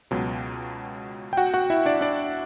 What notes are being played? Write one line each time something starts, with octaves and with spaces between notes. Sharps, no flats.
C#2 B2 F#3
G5
F#4 F#5
F#4 F#5
E4 E5
D4 D5
D4 D5